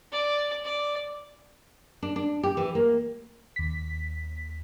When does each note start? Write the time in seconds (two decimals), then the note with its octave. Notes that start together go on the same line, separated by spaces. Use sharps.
0.13 D5
0.65 D5
2.03 D4
2.16 D4
2.43 G4
2.57 E3
2.75 A#3
3.56 D#2 B6